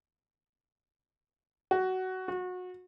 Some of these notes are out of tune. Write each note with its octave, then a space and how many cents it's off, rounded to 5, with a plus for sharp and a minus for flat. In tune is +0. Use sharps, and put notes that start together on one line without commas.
F#4 +15
F#4 -25